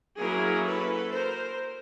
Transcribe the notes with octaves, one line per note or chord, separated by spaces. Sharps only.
F#3 A#3 C#4 E4 G#4 A#4
A4 B4
A#4 C5